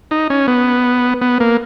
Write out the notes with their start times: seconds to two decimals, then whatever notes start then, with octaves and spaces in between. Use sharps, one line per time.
0.11 D#4
0.30 C#4
0.48 B3
1.22 B3
1.40 A#3